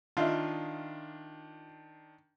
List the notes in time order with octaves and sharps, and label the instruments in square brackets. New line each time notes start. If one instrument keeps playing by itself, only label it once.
[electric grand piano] D#3 D4 [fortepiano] F4 D#5 E5